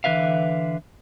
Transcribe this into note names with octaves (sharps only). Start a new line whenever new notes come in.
D3 E3 E4 B4 E5 F5